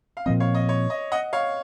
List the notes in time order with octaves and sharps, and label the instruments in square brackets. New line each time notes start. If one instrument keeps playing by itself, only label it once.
[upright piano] F5
[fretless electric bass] A#2 F3 C4 [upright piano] D#5
[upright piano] C#5 F5
D#5
C#5
D#5
D#5 F#5
C#5 F5